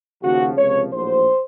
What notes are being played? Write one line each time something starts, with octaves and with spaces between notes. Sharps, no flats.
D#2 C#3 F3 F#4
C#2 C3 F3 C#5
A#1 A2 F#3 C5